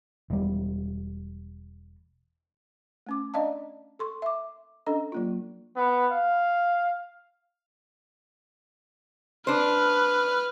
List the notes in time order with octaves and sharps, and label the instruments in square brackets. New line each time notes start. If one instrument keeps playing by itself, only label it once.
[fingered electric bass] E1 G3
[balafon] A3 C#4 D6
D4 D5 D#5 F5 A5
A4 C6 C#6
E5 D6
C#4 D4 A4 D#5
F#3 A#3 F4
[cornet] B3
F5
[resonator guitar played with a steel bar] D4 C5 [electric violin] B4 F6